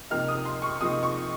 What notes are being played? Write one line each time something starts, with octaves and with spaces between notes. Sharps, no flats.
C3 F3 A#3 D#4 F6
D#6
C6
C#6
C3 F3 A#3 D#4 D#6
C#6